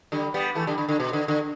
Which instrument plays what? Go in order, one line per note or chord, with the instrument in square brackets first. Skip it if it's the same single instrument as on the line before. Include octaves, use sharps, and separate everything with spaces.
[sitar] D3 G3
G3 B3
E3 A3
D3 G3
D3
D3
B2
D3
D3